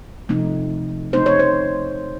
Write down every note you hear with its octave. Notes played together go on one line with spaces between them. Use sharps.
C3 F3 A3 C4 D#4
C#3 A3 C4 D#4 C5
C#5
C5